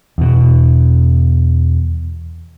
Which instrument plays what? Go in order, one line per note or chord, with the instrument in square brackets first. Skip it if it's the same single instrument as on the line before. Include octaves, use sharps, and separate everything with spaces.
[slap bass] E2 B2